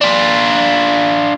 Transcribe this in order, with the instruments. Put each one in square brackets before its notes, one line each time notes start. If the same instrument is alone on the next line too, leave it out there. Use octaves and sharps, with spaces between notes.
[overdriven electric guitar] D4 F4